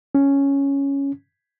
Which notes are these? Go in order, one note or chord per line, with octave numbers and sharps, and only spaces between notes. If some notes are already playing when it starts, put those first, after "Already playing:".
C#4